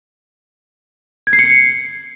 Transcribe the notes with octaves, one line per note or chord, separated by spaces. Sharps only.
G#6
C7
C#7